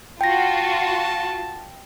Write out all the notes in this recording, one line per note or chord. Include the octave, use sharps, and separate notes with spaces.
F4 F#4 G5 A5 A#6